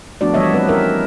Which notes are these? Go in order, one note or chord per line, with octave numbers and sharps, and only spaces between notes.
F3 A3 B3 D4 F#4 D5
E3 G3 B3 C#5 D#5 E5
G3 C4 B4
C#4 E4 A#4 E5